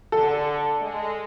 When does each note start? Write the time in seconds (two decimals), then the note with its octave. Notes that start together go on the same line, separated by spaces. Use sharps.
0.12 D3 A4
0.80 G#3